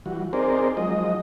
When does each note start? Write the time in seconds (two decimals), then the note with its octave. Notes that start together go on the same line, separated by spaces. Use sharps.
0.06 E3 G3 F#4
0.33 C4 D#4 G#4 A#4 C5 D5
0.77 F3 F#3 G#3 D#4 D#5